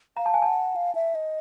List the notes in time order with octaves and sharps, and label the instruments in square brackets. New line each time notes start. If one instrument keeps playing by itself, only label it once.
[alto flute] F5 [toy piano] A#5
[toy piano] A5
G#5
[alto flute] F#5 [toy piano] A5
[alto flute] F5
E5
D#5